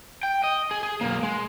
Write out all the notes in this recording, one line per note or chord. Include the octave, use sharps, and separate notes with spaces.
G5
D#5
G#4
G#4
B1 A#3
G#3